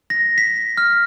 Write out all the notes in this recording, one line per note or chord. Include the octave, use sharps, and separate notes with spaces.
A#6
B6
F6